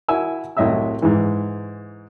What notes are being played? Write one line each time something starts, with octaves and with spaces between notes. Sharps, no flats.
E4 F#4 A#4 G#5 E6
C2 A2 F#3 D#5 E5 E6
G#2 E3